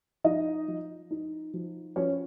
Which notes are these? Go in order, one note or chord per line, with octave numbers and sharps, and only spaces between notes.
F3 D#4 D#5
F3
D#4
F3
F3 C#4 C#5